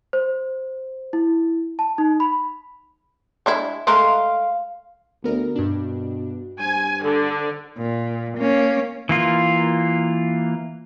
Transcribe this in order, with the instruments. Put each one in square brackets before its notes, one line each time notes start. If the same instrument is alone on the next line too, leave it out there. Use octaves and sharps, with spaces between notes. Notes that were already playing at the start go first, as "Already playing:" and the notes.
[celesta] C5
E4
A5
D#4
B5
[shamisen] G#3 D4 E4
[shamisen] G#3 A3 A#4 [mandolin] F5 C6
[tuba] D2 [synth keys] B3 A#4
[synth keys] G2 D4 [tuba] B2
[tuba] G2 [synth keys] C5 [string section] G#5
[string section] D3
[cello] A#2
A#3 C#4
[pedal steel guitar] E3 A#3 F4